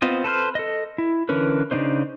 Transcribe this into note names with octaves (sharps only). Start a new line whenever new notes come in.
B3 C4 F4 D#5
A4 B4 C5 F6
A4 D#5
E4
D3 E3 C#4 A#4 B4
C#3 C4 D4 D#4 C5